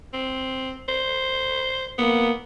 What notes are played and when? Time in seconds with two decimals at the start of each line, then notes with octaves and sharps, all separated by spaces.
0.13 C4
0.89 C5
1.98 A#3 B3